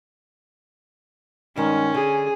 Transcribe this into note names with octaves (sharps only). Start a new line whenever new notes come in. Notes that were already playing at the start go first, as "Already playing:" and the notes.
G2 D#3 G#3 C#4
D3 G#4